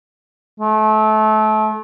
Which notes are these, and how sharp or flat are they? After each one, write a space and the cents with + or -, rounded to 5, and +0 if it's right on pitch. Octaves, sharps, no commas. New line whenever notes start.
A3 -30